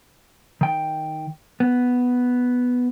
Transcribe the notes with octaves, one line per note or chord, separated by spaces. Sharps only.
D#3 G5
B3